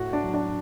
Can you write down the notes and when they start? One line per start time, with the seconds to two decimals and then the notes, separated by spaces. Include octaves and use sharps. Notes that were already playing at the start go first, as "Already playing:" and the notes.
Already playing: A2 F#4 F#5
0.13 D4 D5
0.24 F#3
0.34 D4 D5